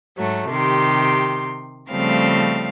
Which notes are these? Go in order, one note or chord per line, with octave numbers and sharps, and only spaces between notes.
G#2 F#3 A3
C3 D#3 G4 C6
C#3 F3 G3 A3 C4 F5